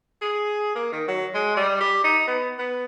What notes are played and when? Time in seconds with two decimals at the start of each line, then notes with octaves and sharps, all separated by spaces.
0.22 G#4
0.75 A#3
0.92 D#3
1.08 F#3
1.35 G#3
1.57 G3
1.80 G4
2.04 D#4
2.27 B3
2.59 B3